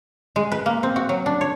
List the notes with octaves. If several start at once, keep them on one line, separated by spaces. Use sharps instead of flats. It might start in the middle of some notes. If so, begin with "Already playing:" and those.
G#3
B4
A#3
C4
F#4
F#3
D4
C#5